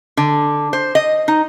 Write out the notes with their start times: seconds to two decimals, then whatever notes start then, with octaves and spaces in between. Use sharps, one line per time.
0.17 D3
0.73 C5
0.95 D#5
1.28 D#4